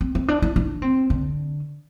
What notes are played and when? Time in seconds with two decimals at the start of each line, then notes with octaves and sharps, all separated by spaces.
0.01 C4
0.15 C4
0.28 D4
0.42 E4
0.56 D4
0.82 C4
1.10 D3